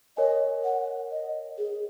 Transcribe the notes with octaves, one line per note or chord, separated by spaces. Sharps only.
A#4 C#5 D#5 G#5
F#5
D#5
G#4